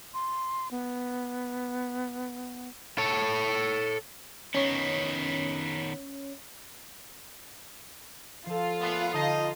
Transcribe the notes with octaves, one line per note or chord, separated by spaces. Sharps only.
C6
B3
A4 C#5
D#3 B3 C#4 C#5
F3 F4 A4
A#2 A3 B3
D3 D#4 D#5 A5 G6